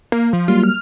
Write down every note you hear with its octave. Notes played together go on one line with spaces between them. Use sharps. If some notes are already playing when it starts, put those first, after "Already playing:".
A#3
F3
F#3 G3 A#3 F4
F6